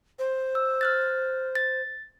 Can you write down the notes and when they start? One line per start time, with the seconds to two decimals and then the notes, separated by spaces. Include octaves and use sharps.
0.19 C5
0.55 E6
0.81 F6 F#6 A6
1.55 A6